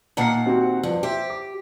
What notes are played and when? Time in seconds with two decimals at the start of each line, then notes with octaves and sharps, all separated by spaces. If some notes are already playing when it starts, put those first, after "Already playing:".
0.17 A#2 D#3 F#5 A5 A#5 C7
0.46 C4 F#4 G4
0.83 G2 F3
1.03 G4 C5 E5
1.30 D6